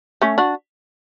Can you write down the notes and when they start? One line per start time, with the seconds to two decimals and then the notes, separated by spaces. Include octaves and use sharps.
0.22 A3 C#4
0.38 D4 F#4